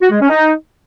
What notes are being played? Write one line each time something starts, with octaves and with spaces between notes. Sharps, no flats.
F#4
G#3
C#4
D#4